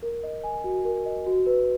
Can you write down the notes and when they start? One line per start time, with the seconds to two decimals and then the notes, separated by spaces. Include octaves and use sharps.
0.03 A#4
0.23 D#5
0.44 G#5
0.64 F#4
0.85 A#4
1.06 D#5
1.27 F#4
1.46 B4